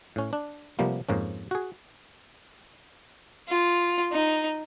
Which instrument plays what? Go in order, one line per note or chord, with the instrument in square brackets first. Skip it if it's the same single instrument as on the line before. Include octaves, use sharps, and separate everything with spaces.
[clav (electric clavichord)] A2 C#4
D4
C3 F3 G3 A#3 B3
F2 G#2 A#3 C#4
F#4 G#4
[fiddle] F4
D#4